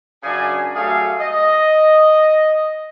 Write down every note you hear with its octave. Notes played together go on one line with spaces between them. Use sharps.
F#2 C#3 D4 G#4 D5 G#5
F#3 G3 A3 G#4 A4 F5
D#5